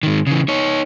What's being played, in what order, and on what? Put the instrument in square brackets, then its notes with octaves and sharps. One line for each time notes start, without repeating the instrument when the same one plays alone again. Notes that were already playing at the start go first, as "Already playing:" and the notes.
[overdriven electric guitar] G#2 D#3
C#3 E3
D#4 C#5